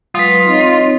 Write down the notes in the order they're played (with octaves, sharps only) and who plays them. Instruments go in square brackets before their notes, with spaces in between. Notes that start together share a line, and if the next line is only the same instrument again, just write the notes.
[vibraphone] F#3 G#3 B4 [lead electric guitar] F4 [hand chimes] D#6 B6
[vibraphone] C4 C#5 [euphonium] D#4